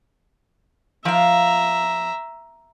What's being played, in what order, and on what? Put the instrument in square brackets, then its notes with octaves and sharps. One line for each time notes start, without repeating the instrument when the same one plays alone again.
[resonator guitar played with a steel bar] F3 F5 [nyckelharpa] E5 A#5